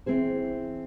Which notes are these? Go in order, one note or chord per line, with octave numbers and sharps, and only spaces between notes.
E3 C4 E4 G#4 C5